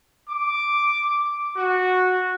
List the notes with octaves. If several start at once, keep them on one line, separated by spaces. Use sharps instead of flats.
D6
F#4